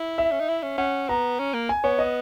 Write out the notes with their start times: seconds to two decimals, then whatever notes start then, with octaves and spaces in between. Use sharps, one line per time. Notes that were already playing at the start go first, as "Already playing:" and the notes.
Already playing: E4
0.18 E5
0.32 C#4
0.40 D#4
0.49 E4
0.63 C#4
0.78 C#4 F#5
1.09 B3 A#5
1.39 C#4
1.54 A#3
1.69 G#5
1.84 B3 C#5
1.99 D#5